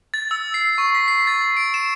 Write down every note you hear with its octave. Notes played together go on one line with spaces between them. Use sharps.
A6
E6
C7
C#6
B6
C7
A6
D7
E7